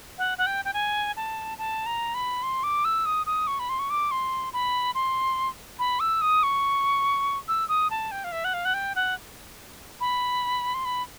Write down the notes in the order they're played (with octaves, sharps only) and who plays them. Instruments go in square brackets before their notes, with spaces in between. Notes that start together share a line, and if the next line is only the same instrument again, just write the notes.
[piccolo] F#5
F#5
G5
G5
G#5
A5
A5
A#5
B5
C6
D6
E6
D#6
D#6
C#6
B5
C6
C#6
D6
C6
B5
C6
B5
E6
D#6
C#6
E6
D#6
A5
G5
F5
E5
F#5
F5
F#5
G5
F#5
B5
C6
B5